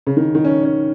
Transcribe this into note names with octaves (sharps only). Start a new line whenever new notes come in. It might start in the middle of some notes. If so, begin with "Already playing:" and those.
C#3
D#3
D#3
C#4
C#4